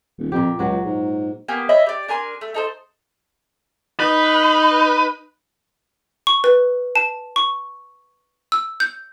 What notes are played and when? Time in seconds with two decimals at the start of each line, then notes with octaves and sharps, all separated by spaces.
0.18 D#1
0.32 F2 A#2 G4
0.59 C#2 F#3 F#4
0.85 G#2
1.48 A#3 B3 G4 G#5
1.69 C#5 D#5 E5 B5
1.86 G4 D5
2.08 D4 A#4 G#5 C6
2.41 A3
2.54 D#4 A4 C5
4.00 D#4 B4
6.27 C#6
6.44 B4
6.96 A5
7.36 C#6
8.52 E6
8.80 G6